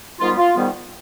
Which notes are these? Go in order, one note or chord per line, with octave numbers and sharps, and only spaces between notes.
G#2 D#3 G3 B3 F4
F4
G#2 D#3 G3 B3